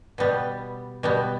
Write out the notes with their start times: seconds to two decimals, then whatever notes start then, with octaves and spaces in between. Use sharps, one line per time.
0.18 B2 G3 B3
1.03 B2 G3 B3